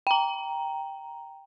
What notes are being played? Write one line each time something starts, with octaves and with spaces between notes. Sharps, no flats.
G5 A#5